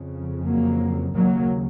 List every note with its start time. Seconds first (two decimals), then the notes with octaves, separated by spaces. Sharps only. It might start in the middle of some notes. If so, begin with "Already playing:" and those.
Already playing: F2 C#3
0.44 F#3 A#3
1.15 D#2 C#3 F#3 A#3